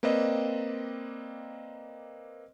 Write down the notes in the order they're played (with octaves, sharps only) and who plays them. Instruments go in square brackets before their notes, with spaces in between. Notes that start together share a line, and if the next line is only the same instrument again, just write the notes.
[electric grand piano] A#3 C4 B4 D5 D#5